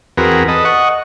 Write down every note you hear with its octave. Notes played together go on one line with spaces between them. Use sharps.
E2 C4 F#4 G#4 A#4 B4
A4 B4 D#5
D#5 F#5 C#6